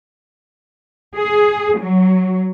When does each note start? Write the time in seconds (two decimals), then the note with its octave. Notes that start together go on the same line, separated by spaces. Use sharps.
1.16 G#4
1.78 F#3